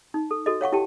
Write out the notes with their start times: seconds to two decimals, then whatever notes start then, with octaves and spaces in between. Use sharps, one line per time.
0.14 D#4
0.31 A4
0.46 F#4 A4 D#5
0.61 C#5 F5 F#5 C#6
0.72 E4 G4 G5 A5